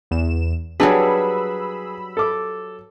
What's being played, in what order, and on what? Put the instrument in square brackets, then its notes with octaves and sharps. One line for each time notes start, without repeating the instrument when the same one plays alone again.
[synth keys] E2 E7
[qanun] F#3 G3 B4 [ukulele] D4 [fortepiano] G#4 G#5 [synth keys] B5 E6
[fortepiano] A4 D6